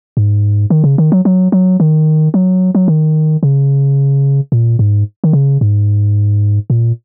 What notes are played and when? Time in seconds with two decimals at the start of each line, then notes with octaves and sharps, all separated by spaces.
0.17 G#2
0.70 D#3
0.84 C#3
0.98 D#3
1.12 F#3
1.25 F#3
1.52 F#3
1.80 D#3
2.34 F#3
2.75 F#3
2.88 D#3
3.43 C#3
4.52 A#2
4.79 G#2
5.24 D#3
5.33 C#3
5.61 G#2
6.70 A#2